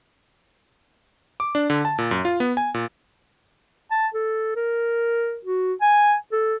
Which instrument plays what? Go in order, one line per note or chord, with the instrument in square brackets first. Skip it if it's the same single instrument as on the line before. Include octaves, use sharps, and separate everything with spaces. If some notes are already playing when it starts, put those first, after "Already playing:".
[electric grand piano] D6
D4
D3
A5
A#2
F#2
F4
B3
G#5
A#2
[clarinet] A5
A4
A#4
F#4
G#5
A4